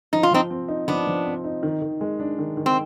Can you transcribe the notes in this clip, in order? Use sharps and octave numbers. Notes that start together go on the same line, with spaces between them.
F3 D#4
F4
F3 C4 D#4
C4
D#4
F3 B3 D4
F3
C4
D#4
D#3
D#3
G#3
D4
D#3
D#3
C4